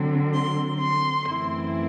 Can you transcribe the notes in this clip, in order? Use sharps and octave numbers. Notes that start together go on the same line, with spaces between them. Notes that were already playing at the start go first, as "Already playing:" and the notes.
Already playing: D3 F#3 C4
C6
C6
F#2 E3 A3 C4 E4